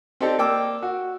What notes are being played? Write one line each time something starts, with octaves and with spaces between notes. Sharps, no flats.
C4 D#4 G4 A4 D5
A#3 D5 G5 D6 E6
F#4